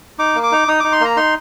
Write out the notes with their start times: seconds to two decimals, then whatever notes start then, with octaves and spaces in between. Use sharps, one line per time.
0.18 D#4 D6
0.35 A#3
0.43 D6
0.52 D#4
0.68 D#4 D#6
0.80 D#4 D6
0.92 C6
1.01 A#3 A#5
1.17 D#4 C6